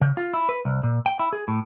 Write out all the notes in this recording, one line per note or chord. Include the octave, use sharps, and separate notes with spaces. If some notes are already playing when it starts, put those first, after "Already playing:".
C#3
F4
E4
B4
C2
A#2
G5
E4
G#4
A2